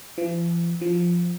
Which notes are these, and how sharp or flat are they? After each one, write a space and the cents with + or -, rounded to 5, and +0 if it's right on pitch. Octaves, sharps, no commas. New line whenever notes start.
F3 -45
F3 +0